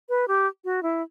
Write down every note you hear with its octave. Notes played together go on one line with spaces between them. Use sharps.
B4
G4
F#4
E4